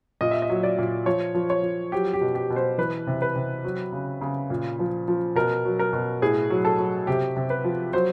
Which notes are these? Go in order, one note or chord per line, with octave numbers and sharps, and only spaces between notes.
A#2 D#5
E5
D#5
F#3
D5
A#2
F3 C#5
F3
C#5
F3
F#3 G4
G4
B2
G4
B2
C5
E3 B4
C3
B4
C3
F#3
C#3
C#3
A#2
F3
F3
B2 A#4
F#3
A#4
B2
A2 G#4
F#3
A4
F#3
C3 G4
C3
B4
F3
F#3 C5